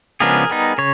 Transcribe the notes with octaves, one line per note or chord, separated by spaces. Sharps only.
C#3 F3 G#3 B3 D4 G#4 A#4
G3 B3 D#4
C#3 C#5